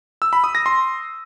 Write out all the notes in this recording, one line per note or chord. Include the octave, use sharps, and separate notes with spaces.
E6
B5
D#6
A#6
C6